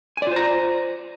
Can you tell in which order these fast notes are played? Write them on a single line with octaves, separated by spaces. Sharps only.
G#5 D5 F4 C5 A#5